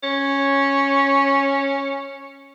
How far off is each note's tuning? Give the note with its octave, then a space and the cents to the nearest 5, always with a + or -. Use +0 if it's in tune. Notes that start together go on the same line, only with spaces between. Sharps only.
C#4 -5